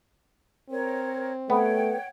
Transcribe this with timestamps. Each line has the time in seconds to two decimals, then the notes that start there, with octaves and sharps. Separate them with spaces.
0.69 C4 A#4 C#5
1.50 A3 B3 C#5 F#5 G5